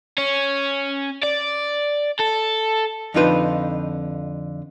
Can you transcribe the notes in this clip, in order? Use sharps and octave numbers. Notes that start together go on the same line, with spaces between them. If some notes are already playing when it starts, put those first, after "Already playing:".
C#4
D5
A4
F2 D3 D#4 F4 B4 C5